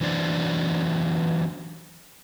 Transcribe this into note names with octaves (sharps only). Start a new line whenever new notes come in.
E3 F#3 D4 C5 D5